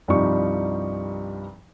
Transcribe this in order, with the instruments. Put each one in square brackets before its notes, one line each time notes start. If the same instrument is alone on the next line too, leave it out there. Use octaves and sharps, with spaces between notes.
[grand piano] C2 G2 F3 G3 D#4 C#6